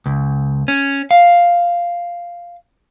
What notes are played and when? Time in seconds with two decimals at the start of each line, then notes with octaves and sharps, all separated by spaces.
0.06 C#2
0.68 C#4
1.11 F5